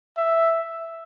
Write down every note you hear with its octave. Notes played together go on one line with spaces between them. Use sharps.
E5